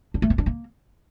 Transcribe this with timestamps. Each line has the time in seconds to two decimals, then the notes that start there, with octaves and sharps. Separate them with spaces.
0.14 D4
0.22 A3
0.30 C4
0.38 D4
0.46 A#3